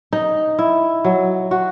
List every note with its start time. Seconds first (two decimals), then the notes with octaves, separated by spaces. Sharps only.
0.13 D#4
0.59 E4
1.05 F#3
1.51 F#4